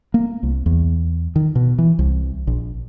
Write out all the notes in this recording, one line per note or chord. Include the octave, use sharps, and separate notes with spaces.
A#3
C2
E2
D#3
B2
E3
C2
A#1